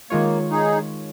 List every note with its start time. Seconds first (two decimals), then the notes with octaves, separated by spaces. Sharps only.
0.10 D#3 G#3 A#3 F4 C#5
0.50 D#4 G#4